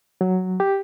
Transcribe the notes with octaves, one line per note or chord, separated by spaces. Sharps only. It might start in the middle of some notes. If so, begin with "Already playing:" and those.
F#3
G4